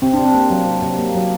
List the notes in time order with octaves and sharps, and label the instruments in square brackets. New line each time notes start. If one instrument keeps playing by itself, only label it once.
[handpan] C3 C4
C3 D4
C4
A#3
F#3
C3
C3
A#3
F#3